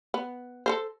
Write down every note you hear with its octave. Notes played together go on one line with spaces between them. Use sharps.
B3
A4 A#4 C5